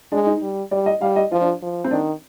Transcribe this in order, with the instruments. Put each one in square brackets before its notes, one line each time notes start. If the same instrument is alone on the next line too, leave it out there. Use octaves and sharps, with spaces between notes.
[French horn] G#3 [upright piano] D4
[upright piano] D#4
[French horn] G3
[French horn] G3 [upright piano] D5
[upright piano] D#5
[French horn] G3 [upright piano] F5
[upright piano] D#5
[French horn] F3 [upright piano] F4
[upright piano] D4
[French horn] F3
[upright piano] C4
[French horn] D#3 [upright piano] D4